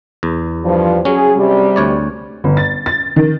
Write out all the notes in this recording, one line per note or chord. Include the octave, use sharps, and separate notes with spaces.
E2
G2 F3
F#3 C#4 G#4
C3 G3
D2 C#5 D5
G1
A6
A6
D#3